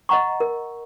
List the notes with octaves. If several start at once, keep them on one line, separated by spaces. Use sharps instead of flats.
D#5 F#5 A#5 C#6
A#4